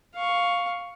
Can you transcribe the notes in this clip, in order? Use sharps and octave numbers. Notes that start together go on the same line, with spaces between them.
F5 C#6